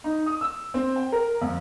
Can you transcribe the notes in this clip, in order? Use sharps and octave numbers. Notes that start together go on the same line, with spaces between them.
D#4
D#6
E6
C4
G5
A#4
F2